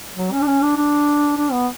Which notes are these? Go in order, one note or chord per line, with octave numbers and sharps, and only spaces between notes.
F#3
C#4
D4
C#4
D4
D4
D4
B3